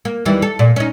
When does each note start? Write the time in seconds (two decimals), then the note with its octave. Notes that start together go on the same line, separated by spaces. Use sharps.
0.05 A#3
0.25 D#2 E3 G3
0.42 A4
0.59 A#2
0.76 C#4 D#4